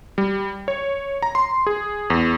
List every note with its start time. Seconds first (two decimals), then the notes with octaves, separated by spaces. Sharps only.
0.18 G3
0.68 C#5
1.22 A#5
1.35 C6
1.67 G#4
2.10 E2